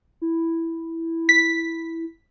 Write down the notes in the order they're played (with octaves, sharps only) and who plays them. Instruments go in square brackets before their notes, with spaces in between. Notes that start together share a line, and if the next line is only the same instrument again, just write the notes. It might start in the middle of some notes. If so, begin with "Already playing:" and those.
[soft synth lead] E4
[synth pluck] B6